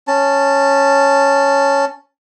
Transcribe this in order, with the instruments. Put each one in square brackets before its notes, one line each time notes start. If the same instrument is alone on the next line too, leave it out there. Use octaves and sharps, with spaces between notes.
[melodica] C#4 A5